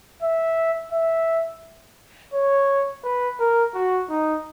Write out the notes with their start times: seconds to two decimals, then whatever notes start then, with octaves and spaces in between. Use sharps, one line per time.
0.23 E5
0.93 E5
2.34 C#5
3.04 B4
3.40 A#4
3.75 F#4
4.10 D#4